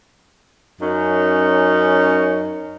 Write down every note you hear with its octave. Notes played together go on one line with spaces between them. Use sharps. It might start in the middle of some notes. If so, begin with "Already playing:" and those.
F#2 C#4 D#4